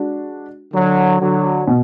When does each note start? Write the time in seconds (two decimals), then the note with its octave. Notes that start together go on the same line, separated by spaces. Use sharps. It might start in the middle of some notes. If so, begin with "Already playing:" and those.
Already playing: G#3 D4 F#4
0.73 D3 F#3
1.20 D3 F#3
1.67 B2